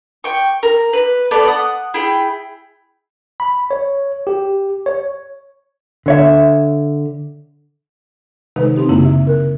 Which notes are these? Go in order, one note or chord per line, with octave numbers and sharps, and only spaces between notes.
G5 C#6
A#4
B4
B3 A4 D5 A5
F#5 D#6
E4 G#4 G5
B5
C#5
G4
C#5
D3 C#5 E5
C3 D#3 G#3 D#4 A4 B4
C#3 C4 D#4 G4
F#2 C#3 G#3 A#3 D#4 E4
E5
A#4 F#6